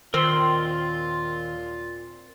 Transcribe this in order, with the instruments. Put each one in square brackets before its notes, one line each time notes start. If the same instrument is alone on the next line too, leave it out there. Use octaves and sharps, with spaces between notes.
[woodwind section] D#2 A#2 F4 [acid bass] D#3 [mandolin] C4 [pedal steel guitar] A#4 C6